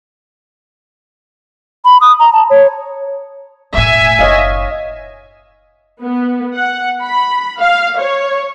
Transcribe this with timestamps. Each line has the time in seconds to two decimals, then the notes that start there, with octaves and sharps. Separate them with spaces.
1.85 B5
2.01 D#6
2.19 A#5
2.33 A5
2.50 C#5
3.74 E1 A2 E5 G#5
4.19 F#1 C#5 D#5 F5
6.01 B3
6.56 F#5
7.02 B5
7.60 F5
7.99 C#5